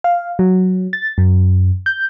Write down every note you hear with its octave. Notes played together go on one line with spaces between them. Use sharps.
F5
F#3
A6
F#2
G6